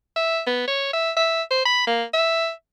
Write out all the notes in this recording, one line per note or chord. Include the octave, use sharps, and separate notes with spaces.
E5
B3
C#5
E5
E5
C5
B5
A#3
E5